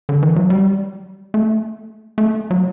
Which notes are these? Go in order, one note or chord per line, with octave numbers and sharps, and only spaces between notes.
D3
E3
F#3
G3
A3
A3
F#3